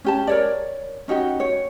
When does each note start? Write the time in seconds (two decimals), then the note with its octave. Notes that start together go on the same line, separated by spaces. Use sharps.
0.04 C#4 G4 A5
0.27 A#4 C#5 D5
1.08 C#4 D#4 F#4 G4
1.40 C#5